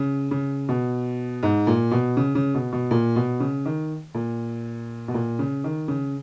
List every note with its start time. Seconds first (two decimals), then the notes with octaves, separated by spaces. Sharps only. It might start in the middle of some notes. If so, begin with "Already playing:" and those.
Already playing: C#3
0.31 C#3
0.69 B2
1.43 G#2
1.67 A#2
1.91 B2
2.17 C#3
2.35 C#3
2.54 B2
2.73 B2
2.91 A#2
3.16 B2
3.40 C#3
3.65 D#3
4.14 A#2
5.08 B2
5.14 A#2
5.39 C#3
5.64 D#3
5.88 C#3